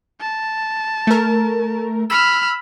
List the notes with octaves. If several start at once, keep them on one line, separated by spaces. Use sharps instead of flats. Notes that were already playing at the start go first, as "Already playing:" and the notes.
A5
A3 A#4
B5 E6 F6